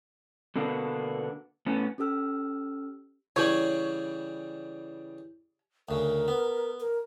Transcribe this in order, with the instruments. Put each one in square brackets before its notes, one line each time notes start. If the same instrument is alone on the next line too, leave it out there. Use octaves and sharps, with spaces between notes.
[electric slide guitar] B2 D3 A#3 B3 D4
A2 B3 C#4
[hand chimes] C#4 G4 A4 E6 F6
[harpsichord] C#3 E3 G3 [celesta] E4 G6 F#7 [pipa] C#5
[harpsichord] D2 C#3 [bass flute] A#4
[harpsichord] B3
[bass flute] A#4